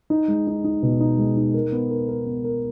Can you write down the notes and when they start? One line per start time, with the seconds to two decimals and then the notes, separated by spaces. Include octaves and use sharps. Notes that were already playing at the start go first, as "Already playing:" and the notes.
0.10 D#4
0.28 G#3
0.47 D#4
0.64 D#4
0.83 B2
1.00 D#4
1.18 G#3
1.37 D#4
1.54 A#4
1.72 B3
1.91 A#4
2.08 A#4
2.26 B3
2.44 A#4